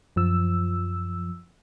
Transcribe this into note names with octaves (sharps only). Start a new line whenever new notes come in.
F#2 F3 E6